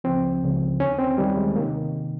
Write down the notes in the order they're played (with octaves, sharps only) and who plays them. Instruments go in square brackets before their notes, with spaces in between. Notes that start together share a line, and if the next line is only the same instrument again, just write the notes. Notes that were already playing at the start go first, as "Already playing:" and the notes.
[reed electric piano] C#2 C#3 F3 C4
C#2 C#3 F3
D#2 D#3 C#4
C4
D#2 D#3 G3
G#3
C3 D#3 A#3